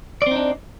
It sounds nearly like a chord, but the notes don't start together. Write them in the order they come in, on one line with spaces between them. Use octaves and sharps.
D5 C4 D#4 D4